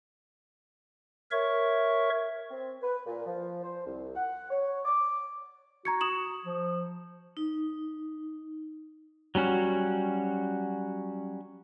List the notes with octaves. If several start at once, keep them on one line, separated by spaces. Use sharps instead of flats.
A#4 C#5 E5 C#6
C4
B4
A#2
F3
C5
C2
F#5
C#5
D6
F#4 A#5 G#6 C#7
D#6 E7 F#7
F3
D#4
F#3 G3 C#4 F#4